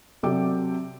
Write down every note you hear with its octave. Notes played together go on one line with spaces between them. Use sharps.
C3 F#3 A4 D5 G5 D6